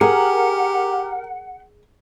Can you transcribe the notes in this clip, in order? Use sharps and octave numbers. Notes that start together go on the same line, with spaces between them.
G4 G#4 A#4 F#5